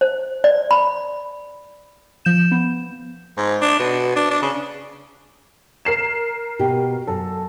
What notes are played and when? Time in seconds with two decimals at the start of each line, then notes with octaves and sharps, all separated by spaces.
0.01 C5
0.44 D5
0.71 B5
2.25 F3 G6 E7
2.52 B3
3.37 G#2
3.62 D4
3.79 B2
4.16 D4
4.31 D4
4.42 C#3
5.85 A#4 C7 E7
6.59 B2 G4
7.07 F#2 A4